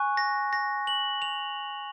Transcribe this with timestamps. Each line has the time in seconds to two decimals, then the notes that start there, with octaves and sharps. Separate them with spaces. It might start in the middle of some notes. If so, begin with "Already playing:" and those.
Already playing: G#5 C#6 F#6
0.17 A#6
0.53 A#6
0.87 F#7
1.22 F7